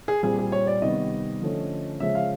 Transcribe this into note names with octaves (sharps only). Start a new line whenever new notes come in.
G#4
A#2 G3 C4 G#4
G#4
C#5
D5
C3 D#3 G3 B3 D#5
D3 F3 A3 C#4
C#3 F3 G#3 C#4 E5
F5